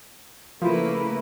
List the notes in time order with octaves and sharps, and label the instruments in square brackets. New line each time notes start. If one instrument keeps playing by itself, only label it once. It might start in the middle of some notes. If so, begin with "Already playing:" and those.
[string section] C#3 A3 A#3 [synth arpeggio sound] F3 [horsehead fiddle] E4 B4